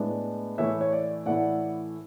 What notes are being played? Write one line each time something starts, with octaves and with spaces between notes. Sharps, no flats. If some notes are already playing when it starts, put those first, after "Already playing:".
Already playing: A2 G#3 B3 D4
A2 E3 A3 E4 C#5 E5
C#5
D5
A2 E3 A3 E4 D5 F#5